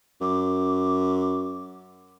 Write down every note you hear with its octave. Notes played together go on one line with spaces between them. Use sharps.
F#2 D6